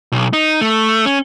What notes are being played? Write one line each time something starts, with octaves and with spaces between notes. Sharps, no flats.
B1
D#4
A3
C#4